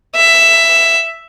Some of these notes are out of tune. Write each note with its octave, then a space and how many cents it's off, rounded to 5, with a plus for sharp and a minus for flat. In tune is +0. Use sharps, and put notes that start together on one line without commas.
E5 +10